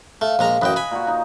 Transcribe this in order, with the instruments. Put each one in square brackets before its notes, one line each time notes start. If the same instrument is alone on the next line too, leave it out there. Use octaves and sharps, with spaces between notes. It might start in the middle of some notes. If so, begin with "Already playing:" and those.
[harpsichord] A3 [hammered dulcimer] F5
[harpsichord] A#1 G#3 A#5
[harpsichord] A1 F#2 G5 [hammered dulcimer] B4 D#5
[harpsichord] G#5 B5
[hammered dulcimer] A#2 F#4
D#4